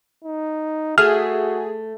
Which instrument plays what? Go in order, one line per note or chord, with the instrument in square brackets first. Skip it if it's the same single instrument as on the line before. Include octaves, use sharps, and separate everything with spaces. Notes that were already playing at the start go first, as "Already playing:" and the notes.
[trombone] D#4
[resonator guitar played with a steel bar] A3 [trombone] F#4 [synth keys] G#4 [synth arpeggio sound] F6